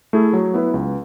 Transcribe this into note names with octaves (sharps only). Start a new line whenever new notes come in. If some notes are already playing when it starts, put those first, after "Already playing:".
A3 E4 G#4
F#3
B3 E4 B4
C#2